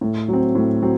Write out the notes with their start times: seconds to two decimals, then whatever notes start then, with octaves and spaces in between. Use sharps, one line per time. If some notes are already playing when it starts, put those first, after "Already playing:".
0.01 A2
0.28 F#3 C4
0.55 A2
0.82 F#3 C4